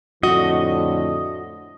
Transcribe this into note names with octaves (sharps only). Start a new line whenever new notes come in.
F2 A2 D3 A3 F#4 D#5